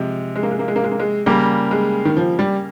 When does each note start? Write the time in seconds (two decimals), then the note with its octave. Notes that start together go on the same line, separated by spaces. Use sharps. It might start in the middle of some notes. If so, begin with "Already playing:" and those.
Already playing: C3 F3 G#3
0.36 G#3
0.43 A#3
0.51 G#3
0.59 A#3
0.68 G#3
0.76 A#3
0.84 G#3
0.91 A#3
1.00 G#3
1.26 C#3 G3 A#3
1.71 G#3
2.05 D#3
2.17 F3
2.39 G3